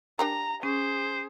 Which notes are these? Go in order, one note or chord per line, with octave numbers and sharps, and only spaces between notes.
D4 G4 A#4 A#5
C#4 G#4 C5